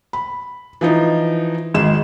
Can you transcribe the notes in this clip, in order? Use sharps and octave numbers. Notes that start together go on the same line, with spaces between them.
B5
E3 F3 D#4
G#1 G#3 E7